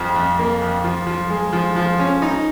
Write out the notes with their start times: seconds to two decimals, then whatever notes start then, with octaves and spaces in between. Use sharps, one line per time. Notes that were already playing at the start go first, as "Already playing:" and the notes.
Already playing: F2 F3
0.16 F2
0.39 A#3
0.62 F2
0.84 F3
1.07 F3
1.30 G#3
1.53 F3
1.76 F3
1.99 C#4
2.22 D#4